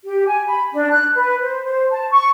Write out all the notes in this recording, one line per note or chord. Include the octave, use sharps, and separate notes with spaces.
G4
G#5
B5
D4
F#6
B4
C5
C5
A5
C#6